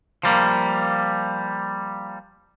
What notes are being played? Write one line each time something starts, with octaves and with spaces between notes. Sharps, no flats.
F3 G3 A#3